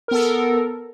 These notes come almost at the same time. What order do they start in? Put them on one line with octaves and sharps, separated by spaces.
A#4 B3 A4